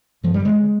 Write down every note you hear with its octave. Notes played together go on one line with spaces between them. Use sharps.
G2 F3
G3
D3 G#3